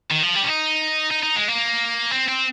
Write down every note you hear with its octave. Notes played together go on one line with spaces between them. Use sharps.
D#3
F3
G3
C#4
D#4
D#4
D#4
G#3
A#3
C4
C4